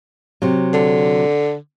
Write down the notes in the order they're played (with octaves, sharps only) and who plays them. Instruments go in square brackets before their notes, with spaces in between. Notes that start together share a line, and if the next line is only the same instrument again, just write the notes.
[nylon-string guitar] C3 F#3
[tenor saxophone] D3